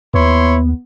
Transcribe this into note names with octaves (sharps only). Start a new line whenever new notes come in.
D#2 B3 E4 C#5 C6